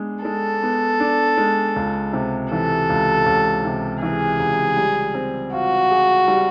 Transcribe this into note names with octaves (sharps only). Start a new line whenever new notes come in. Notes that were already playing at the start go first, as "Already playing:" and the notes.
Already playing: G#3 B3 D4
G#3 A4
B3
D4
G#3
C#2
C3
E3 A4
C#2
C#2
C3
E3 G#4
C#2
G3
C4
F4 F#4
G#4
G3